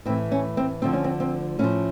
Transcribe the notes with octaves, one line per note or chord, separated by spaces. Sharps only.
A2 E3 C4
C#4
C4
D2 D3 F3 C4
C#4
C4
C4
A2 F3 C#4